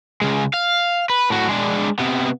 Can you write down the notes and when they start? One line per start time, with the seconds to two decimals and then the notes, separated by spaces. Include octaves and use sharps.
0.22 C#3 G#3
0.54 F5
1.10 B4
1.30 A2 F#4
1.49 G#3 D4
1.99 C3 B3